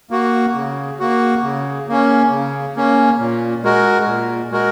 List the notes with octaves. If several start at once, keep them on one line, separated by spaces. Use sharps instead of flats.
A#3 F#4
C#3
A#3 F#4
C#3
A#3 C#4
C#3
A#3 C#4
A#2
G#3 F#4 A#4
A#2
G#3 F#4 A#4